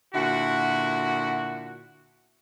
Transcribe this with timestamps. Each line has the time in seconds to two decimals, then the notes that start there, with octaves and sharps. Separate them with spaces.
0.14 A#2 D3 E4 F#4